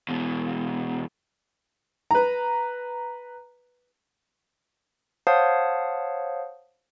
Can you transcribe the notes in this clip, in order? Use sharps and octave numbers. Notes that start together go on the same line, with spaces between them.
E2 B2
B4 A#5
C5 C#5 F5 F#5 A5 D#6